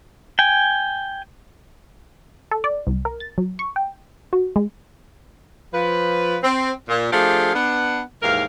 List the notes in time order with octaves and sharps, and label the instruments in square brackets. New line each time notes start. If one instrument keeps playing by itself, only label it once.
[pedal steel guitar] G5 G#5
[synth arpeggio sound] A4
D5
C2
A#4
A6
F#3
C#6
G5
F#4
G#3
[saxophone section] F3 B4
C4
A#2
F3 A3 D4 G4 G#4 F5
B3 D4 F#5
D#2 G#2 E3 A#4 F5